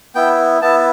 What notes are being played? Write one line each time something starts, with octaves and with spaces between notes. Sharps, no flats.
B3 E4 G5
B3 E4 A5